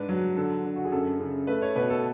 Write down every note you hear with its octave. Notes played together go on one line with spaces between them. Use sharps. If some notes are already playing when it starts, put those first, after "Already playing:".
Already playing: G#2 D4 B4
F#3
D3 A4
D3
F#4
G#4
F#2 A4
C#3
A3 B4
C#5
B2 B4
A4